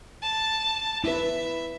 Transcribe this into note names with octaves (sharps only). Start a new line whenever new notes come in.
A5
E4 B4 E5